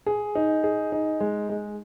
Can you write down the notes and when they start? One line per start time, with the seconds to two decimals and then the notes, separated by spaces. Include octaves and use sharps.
0.06 G#4
0.35 D#4
0.64 G#4
0.92 D#4
1.20 G#3
1.49 G#3